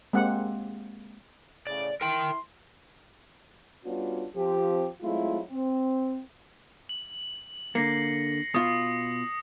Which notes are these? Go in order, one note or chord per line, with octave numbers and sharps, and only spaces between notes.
G#3 A#3 C4 G4 F#5
A2 C#3 D5
E4 A#4 G5 C6
G3 B3 C#4 D4 F4 F#4
F3 C4 G4
F#3 G#3 A3 C4 E4 F4
C4
F#7
D3 A#3 A#6 C7 C#7
B2 F4 D#6